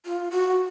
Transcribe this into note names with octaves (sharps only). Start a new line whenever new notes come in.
F4
F#4